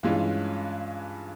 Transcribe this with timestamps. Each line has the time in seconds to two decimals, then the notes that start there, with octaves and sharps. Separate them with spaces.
0.03 G2 E3 G#3 C#4 F4